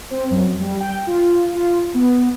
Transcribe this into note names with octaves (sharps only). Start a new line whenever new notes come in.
C4
F#2
G3
G5
F4
F4
B3